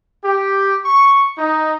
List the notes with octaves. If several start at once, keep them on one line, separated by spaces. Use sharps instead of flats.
G4
C#6
D#4